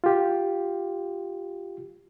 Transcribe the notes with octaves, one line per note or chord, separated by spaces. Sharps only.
F4 G4